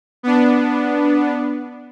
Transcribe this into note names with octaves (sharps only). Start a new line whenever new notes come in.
B3 D4